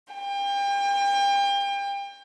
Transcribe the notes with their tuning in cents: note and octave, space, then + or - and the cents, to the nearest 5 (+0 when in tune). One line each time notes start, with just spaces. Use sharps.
G5 +35